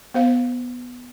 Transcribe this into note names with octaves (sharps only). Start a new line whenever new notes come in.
B3 C5 F5